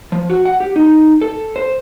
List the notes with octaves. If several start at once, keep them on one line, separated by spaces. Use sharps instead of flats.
F3
F#4
F#5
G4
D#4
A4
C5